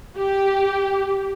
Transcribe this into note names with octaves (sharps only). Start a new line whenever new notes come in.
G4